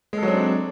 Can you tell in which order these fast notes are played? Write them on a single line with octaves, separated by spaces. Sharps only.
G#3 A4 F#3 C4 D4